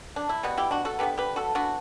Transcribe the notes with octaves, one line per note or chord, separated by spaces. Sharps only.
D4
E4
B2 G3 B3 F#4
E4 G4
D4 F#4
F#4 A4
D3 G3 B3 G4 B4
G4 B4
F#4 A4
E3 B3 D4 F#4